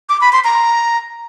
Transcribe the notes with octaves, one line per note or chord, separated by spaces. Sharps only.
D6
B5
C6
A#5